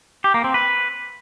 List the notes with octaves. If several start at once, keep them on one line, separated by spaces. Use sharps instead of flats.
G4
A#3
C4
B4